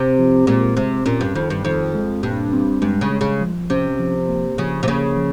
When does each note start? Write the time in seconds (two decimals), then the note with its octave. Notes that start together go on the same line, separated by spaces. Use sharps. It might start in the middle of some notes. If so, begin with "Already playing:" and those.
Already playing: C3
0.19 F3
0.47 A#2 G#3
0.77 C3 G#3
1.06 A#2 C#4
1.21 G2
1.35 F2 D#3
1.50 G2
1.64 F2 D#3
1.95 G#3
2.23 G2 A#2
2.53 C4
2.82 G2 G#3
3.01 C#3
3.11 G#3
3.21 C#3
3.41 F3
3.70 C3 C#4
3.99 F3
4.28 A#3
4.58 C#3 F3
4.83 C3
4.87 C#3 A#3
5.17 F3